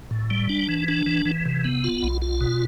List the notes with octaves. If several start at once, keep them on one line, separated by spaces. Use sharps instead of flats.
A2
G3
D4
E3
D4
E3
E3
C3
B3
F4
B1
F4
B2